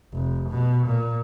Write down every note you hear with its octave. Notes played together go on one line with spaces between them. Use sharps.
F1
B2
A#2